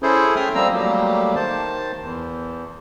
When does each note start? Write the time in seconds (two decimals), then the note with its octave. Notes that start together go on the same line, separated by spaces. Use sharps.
0.03 C#4 E4 G#4 A4 C5
0.36 E5 G5 D#6 F6
0.55 F3 G3 A#3 C4 A#5 E6
0.73 F#3 G3 A3 A#3 G4
1.35 D#3 C5 A5
2.02 E2